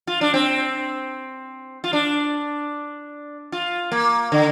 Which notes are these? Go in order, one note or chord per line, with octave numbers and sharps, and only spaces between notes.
F4
D4
C4
F4
D4
F4
A#3
D3